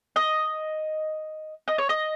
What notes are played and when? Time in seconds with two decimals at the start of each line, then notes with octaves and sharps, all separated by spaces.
0.16 D#5
1.68 D#5
1.78 C#5
1.89 D#5